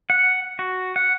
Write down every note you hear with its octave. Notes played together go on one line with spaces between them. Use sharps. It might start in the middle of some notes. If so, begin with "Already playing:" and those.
F#5
F#4
F#5